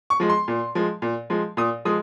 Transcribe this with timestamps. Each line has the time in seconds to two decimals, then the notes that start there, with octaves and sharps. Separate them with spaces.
0.10 C#6
0.20 F3 G#3
0.30 C6
0.48 A#2
0.75 F3 G#3
1.02 A#2
1.30 F3 G#3
1.57 A#2 D#6
1.85 F3 G#3 D#6